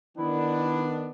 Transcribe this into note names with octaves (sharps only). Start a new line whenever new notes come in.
D#3 B3 D4 E4